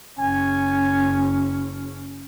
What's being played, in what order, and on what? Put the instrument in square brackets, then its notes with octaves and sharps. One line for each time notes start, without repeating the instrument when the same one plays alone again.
[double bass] F#1 C#4 [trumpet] G#5